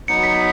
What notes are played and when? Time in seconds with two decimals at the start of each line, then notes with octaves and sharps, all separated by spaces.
0.08 F#3 B3 D#4 C#7
0.23 B6